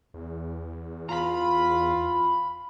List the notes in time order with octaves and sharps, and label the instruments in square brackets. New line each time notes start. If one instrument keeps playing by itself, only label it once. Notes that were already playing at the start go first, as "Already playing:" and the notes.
[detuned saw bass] E2
[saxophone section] F4 [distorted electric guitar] A#5 B5